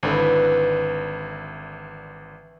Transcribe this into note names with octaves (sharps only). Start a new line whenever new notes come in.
G#1 D3 E3